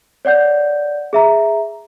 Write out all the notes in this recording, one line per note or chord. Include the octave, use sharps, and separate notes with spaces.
C#5 D5 F#5 G6
G#4 E5 A#5